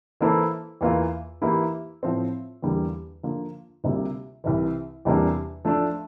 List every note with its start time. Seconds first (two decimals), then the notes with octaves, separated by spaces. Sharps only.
0.21 E3 A#3 E4 A4 C5
0.81 E2 E3 A#3 F4
1.42 E3 A#3 E4 G4
2.03 A2 F3 C4
2.62 E2 D3 G3 A#3
3.23 D3 F3 A#3 F4
3.84 D2 C3 G3 A#3 F4
4.44 C2 C3 E3
5.05 E2 C3 G3 A#3 D4
5.65 F3 A3 D4